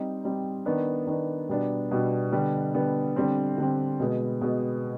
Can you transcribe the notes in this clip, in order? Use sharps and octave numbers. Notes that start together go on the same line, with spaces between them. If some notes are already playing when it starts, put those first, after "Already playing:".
Already playing: G3 C4 D#4
G3 C4 D#4
D#3 B3 D4
D#3 B3 D4
B2 G3 B3 D4
B2 G3 B3 D4
D3 G3 B3
D3 G3 B3
D3 G3 C4
D3 G3 C4
B2 G#3 B3
B2 G#3 B3